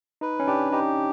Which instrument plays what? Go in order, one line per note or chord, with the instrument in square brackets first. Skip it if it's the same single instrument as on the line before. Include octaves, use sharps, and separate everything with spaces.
[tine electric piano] D#4 [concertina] B4
[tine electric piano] C#4
[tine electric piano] D4 [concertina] G4
[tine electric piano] D#4 [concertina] G4